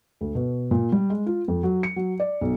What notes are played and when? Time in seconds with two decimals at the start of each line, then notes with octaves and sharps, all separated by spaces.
0.21 D2
0.35 B2
0.71 A#2
0.92 G3
1.10 G#3
1.26 F4
1.48 F2
1.63 F#3
1.83 C#7
1.96 F#3
2.20 D5
2.41 B1